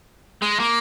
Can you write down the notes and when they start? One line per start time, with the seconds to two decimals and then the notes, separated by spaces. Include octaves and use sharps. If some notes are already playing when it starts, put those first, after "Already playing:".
0.42 G#3
0.60 A#3